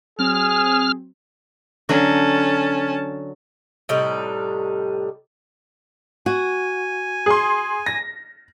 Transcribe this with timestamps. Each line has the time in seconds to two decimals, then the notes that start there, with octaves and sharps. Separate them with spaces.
0.19 F#3 C4 G#4 F6
1.89 D3 F#3 C#4 F#4 A5
3.89 A2 C3 G3 D#4
6.26 F#4 G#5
7.26 G#4 C6
7.86 A#6